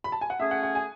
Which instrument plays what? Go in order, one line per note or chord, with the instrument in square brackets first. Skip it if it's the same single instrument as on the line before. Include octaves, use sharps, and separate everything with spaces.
[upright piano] B5
A5
G#5
F#5
[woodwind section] A3 C#4 G#4 [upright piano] E5
[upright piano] F#5
F#5
G#5